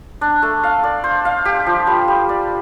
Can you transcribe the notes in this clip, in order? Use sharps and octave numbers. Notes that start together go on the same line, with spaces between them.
D4
A3
F5
D5
C5
F5
G4
F3
G3
G3
D5